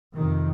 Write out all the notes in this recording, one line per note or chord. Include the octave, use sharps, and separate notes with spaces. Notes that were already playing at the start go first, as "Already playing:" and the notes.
F2 C3 D#3